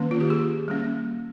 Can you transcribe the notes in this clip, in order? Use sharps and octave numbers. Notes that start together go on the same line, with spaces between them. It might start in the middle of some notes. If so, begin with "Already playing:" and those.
Already playing: D#3 A#3 C#4
F4
G4
G#4
G3 A#3 C#4